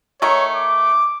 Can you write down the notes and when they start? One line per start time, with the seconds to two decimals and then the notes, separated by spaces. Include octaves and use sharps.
0.22 D#3 A3 C#5
0.55 D6